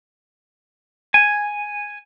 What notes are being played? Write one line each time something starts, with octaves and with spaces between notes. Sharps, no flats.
G#5